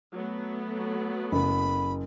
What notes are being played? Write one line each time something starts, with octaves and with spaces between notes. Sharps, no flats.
F#3 A3 B3
F#1 B5